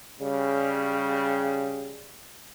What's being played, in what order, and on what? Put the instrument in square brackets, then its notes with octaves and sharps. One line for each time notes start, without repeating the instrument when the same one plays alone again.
[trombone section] C#3 G3